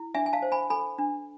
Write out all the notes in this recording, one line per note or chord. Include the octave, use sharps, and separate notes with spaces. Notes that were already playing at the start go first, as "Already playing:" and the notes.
Already playing: E4
D4 E5 G#5
G#5
F5 A5
C5
G#5 B5
A4 G#5 B5
D4